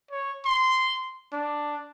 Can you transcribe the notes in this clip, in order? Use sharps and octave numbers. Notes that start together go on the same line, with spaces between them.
C#5
C6
D4